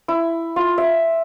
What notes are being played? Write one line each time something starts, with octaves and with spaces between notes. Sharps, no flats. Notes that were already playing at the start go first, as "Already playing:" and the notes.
E4
F4
E5